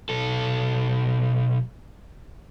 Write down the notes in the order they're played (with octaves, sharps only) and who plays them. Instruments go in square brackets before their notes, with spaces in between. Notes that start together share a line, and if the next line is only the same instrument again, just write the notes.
[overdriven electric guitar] B1 A4